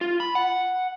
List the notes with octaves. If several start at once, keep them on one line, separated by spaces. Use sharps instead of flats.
F4
B5
F#5